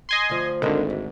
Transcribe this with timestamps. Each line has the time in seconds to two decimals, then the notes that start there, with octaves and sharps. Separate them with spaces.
0.09 D#5 G#5 C6
0.30 D2 F3
0.62 G#1 D2 D3 G#3 A#3
0.90 G#2